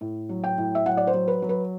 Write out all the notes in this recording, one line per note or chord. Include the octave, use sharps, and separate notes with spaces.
A2
F#3
G5
A2
E5
F#3 F#5
D5
C5
F#3
B4
F#3
B4